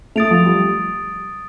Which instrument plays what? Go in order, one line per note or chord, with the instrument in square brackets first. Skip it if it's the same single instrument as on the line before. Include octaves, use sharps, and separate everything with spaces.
[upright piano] A3 [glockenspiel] D#6 A6 D7 F7
[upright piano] F3
G3